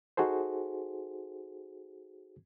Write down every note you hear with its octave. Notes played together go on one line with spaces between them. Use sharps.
D#4 F#4 G#4 A4 C5